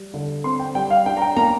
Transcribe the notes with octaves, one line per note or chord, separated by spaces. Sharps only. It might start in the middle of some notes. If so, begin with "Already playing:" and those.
Already playing: G3
D3
C4 C6
G5
G3 G5
F5
D4 G5
A#5
G5
A#3 A#5